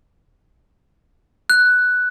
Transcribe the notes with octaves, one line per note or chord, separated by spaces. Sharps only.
F#6